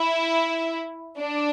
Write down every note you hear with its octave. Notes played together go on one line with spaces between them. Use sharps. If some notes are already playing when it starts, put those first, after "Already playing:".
Already playing: E4
D4